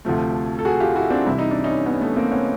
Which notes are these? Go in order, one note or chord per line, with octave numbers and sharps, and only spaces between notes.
D2 C3 F3 A3
A4
F#4 G#4
F4 G4
E4 F#4
C4 D4
C2 C3 E3 G3 E4
D#4
D4
C#4 D#4
B3 C#4
A3 B3
A#3 C4
B3 C#4